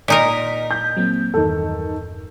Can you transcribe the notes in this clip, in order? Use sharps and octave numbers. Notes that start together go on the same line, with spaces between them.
A#2 D#4 A#4 D#5 B6
G6
F#3 A#3 C4
E2 G2 D#3 A4